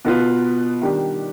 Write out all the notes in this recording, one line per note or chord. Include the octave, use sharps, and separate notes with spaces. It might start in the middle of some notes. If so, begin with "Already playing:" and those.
B2 B3 F4 B4
D#3 G3 D4 G4